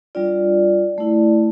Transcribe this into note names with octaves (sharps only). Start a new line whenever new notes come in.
G3 D4 F4 D5
A3 E4